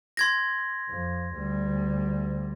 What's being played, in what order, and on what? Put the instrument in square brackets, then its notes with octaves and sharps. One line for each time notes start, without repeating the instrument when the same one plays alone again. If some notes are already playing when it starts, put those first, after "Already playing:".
[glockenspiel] C6 G#6 A#6
[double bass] F2
D2 G3